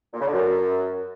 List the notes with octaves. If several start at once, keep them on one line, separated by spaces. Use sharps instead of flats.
A#2
C#3
D3
F#2